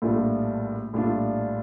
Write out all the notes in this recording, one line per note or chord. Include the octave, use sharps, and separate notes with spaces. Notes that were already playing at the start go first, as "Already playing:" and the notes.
A#1 A2 G3 D4 F4
A#1 A2 G3 D4 F4